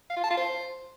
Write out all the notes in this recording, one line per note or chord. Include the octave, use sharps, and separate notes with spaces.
F5
F4
A5
F4
C5